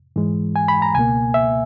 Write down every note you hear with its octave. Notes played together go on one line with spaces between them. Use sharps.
G#2 E3 G#3
G#5
B5
A#5
C#2 B2 A#3 G#5
E5